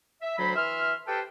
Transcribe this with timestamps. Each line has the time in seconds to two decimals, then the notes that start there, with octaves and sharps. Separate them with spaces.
0.21 E5
0.38 D2 F#3 C5 B5
0.56 E3 E5 C6 F6
1.07 G4 A4 B4 C5 G5 A5